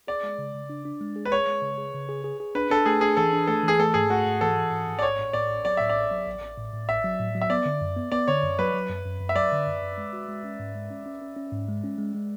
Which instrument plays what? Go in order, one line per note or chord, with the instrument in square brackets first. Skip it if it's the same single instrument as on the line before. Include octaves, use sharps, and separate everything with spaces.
[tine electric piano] G#4 [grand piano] D5
[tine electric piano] G#3
C#3
C#3
D4
D4
G#3
G#4
[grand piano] B4
[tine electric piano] G#4 [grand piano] C#5
[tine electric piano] G#3
C#3
G#4
C#3
G#4
G#4
G#4
[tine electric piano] D4 [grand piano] B4
[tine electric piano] D4 [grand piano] A4
[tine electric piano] A3 [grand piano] G#4
[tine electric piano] D4 [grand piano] G#4
[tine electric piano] E3 [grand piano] A4
[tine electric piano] D4
[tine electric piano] A3 [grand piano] A4
[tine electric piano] E3 [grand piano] G#4
[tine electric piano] A3 [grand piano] A4
[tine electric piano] G#2 [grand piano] G#4
[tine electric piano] A3 [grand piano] F#4
[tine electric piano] G#2
[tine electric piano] E3 [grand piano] A4
[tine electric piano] E3
G#2
G#2
[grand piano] D5
[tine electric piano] A1 [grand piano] C#5
[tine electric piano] A2
[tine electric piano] A2 [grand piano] D5
[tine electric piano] A1
[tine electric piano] F#3 [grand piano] D5
[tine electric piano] A2 [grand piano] E5
[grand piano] D5
[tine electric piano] A1
F#3
A1
A1
A2
A2
[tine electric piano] A1 [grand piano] E5
[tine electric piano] F#3
A2
F#3
[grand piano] E5
[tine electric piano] B3 [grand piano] D5
[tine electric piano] D3
F#2
B3
[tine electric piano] B3 [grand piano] D5
[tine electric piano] D3 [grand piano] C#5
[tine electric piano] F#2
[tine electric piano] F#3 [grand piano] B4
[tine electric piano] F#3
F#2
F#2
F#2
[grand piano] E5
[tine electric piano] F#3 [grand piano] D5
[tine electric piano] D3
F#2
F#2
G#3
F#4
G#3
C#4
G#2
G#3
C#4
C#4
C#4
C#4
G#2
G#3
C#4
G#3
G#3